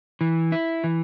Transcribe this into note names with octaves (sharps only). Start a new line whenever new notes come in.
E3
E4
E3